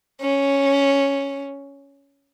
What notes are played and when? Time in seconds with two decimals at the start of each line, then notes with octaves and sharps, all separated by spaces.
0.21 C#4